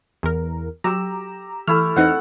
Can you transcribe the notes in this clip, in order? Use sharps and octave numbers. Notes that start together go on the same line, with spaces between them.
E2 A#4
F#3 G4 A#5 E6
E3 A3 E4 A4 F6
E2 C4 D#4 F#5